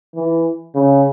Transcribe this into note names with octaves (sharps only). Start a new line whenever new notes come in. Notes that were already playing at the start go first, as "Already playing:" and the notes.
E3
C#3